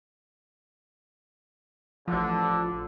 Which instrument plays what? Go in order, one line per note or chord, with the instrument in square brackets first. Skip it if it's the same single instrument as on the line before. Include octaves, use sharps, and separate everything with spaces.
[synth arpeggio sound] A1 F3 [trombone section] D3